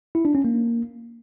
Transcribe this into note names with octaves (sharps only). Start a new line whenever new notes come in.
E4
D4
C#4
A#3